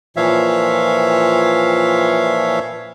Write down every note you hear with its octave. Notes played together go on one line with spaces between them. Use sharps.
A#2 E3 F3 C#5 E5 F5